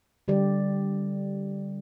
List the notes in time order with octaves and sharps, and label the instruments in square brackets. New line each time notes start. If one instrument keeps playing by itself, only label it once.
[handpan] D3 G3 G4 D5